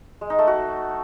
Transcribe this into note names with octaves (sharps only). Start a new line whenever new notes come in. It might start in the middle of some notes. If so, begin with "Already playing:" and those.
G#3
D#4
A3
F#4